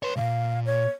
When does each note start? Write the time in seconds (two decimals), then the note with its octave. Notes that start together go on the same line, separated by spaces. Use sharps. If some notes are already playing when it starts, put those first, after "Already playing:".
0.03 B4 C#5 C6
0.16 C2 A#2 F5
0.66 C#5